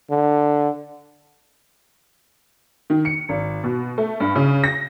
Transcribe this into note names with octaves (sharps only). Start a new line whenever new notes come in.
D3
D#3
C#7
G#1
B2
A3
G2
C#3
A#6